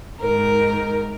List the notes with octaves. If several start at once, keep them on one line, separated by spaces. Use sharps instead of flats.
G#2 D#3 A#4